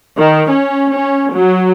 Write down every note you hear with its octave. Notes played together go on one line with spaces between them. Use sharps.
D#3
C#4
C#4
F#3